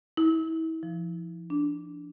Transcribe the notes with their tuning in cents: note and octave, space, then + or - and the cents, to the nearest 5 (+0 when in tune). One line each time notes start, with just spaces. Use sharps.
E4 -35
F3 -30
D4 -5